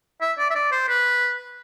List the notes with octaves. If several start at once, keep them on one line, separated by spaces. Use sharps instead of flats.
E5
D5
E5
D5
C5
B4